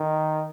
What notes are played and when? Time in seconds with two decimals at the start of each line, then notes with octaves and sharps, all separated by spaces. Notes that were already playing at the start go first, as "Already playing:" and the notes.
Already playing: D#3